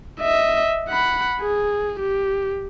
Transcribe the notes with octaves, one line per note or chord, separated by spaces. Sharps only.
D#5 E5
F#5 B5
G#4
G4